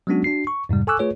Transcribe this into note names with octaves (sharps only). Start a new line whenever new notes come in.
F#3 G#3 B3 C#4 D4 F#4
D4 F#4 C7
C#6
F2 G#2 C3 G3
A4 G#5 C#6 D6 E6 F#6
A3 F4 G#4 B4 C#5